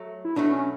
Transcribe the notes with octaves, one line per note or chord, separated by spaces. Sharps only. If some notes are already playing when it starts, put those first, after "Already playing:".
Already playing: F#3 A3
E4
B2 F#3 A3 D4
C#4